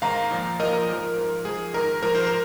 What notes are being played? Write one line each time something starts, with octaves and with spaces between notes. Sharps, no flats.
G#2 D#3 F5 A#5
A#2 F3
A#2 F3 A#4 D#5
A#4
G#2
F3
G#2 F3
G#2 F3 G#4
G#2 D#3 A#4
G#2 F3 A#4
C5
A#4